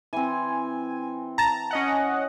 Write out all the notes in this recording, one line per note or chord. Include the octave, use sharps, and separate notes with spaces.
E3 C4 G#5
A5 A#5
C#4 D#5 F#5